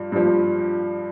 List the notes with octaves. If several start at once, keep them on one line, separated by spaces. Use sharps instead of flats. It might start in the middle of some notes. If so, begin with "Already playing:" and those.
Already playing: G2 F3
G2 F3